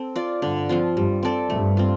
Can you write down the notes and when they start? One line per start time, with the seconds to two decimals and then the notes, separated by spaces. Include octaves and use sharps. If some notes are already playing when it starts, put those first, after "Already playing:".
Already playing: C4 A4
0.16 F4 D5
0.42 G2 D3
0.69 F3 C4 F4
0.97 G2 G3
1.23 C4 A4 D5
1.50 G2 A3
1.77 C4 F4